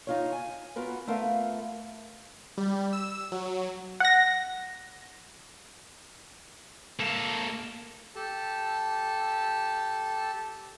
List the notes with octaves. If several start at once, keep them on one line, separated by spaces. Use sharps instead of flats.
D#4 F4 C#5
G#5
B3 F4 F#4 A#4 B4
A3 B3 F4 A#4 F5
G3
E6
F#3
F#5 A#6
A#3 A4
G4 A4 A5